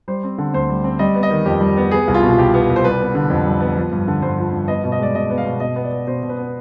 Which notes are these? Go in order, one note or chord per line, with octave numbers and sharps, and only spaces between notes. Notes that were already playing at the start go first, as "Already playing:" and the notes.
G3 C5
C4
D3
D2 C5
G3
C4
G3 D#5
B3
D#5
D#3
F2 G4
G3
B3
B3 G#4
C2
F4
B2
F4
C2 G4
B3
C2
C5
G3 B4
B3
D3
F2
G3
B3
F3
G2
D3
G2 C5
F3
G2
B3 D#5
B2
D#5
G#3 D5
B2 D#5
B3
F5
B2
B2 D#5
B3
D5
B3
B2 C5
B2
B4
B3